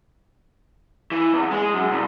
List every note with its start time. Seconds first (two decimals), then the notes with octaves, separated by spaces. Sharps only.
1.11 E3
1.34 E2
1.51 G#3
1.74 F#2
1.91 C2